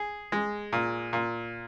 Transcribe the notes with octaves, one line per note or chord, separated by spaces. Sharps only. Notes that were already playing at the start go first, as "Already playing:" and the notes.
Already playing: G#4
G#3
A#2
A#2